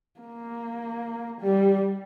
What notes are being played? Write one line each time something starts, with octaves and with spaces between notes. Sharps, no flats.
A#3
G3